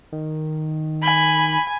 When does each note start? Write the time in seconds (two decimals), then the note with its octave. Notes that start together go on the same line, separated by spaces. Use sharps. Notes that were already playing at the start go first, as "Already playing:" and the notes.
0.12 D#3
1.03 G#5 B5